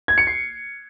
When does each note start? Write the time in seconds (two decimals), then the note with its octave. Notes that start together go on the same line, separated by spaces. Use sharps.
0.08 G#6
0.18 C#7
0.27 C7